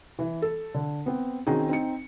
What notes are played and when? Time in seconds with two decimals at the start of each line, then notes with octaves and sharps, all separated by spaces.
0.19 E3
0.42 A4
0.74 D3
1.06 B3 C4
1.47 D#3 C4 C#4 D#4 F#4 G#4
1.69 C4 D#4 C#7